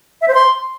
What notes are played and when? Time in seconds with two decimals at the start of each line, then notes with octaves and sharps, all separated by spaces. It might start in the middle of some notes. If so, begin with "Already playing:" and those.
0.22 E5
0.28 C5
0.34 C6